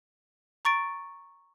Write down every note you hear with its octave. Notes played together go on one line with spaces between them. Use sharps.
A#5 C#6 A6 D7